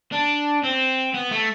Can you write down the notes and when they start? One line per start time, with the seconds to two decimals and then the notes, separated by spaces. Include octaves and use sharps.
0.13 D4
0.63 C4
1.14 B3
1.31 A3